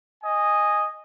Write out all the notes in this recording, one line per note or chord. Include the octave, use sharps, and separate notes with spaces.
D#5 G#5